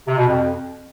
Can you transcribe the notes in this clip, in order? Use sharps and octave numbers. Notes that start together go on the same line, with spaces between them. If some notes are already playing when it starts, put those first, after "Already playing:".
C3
B2
F2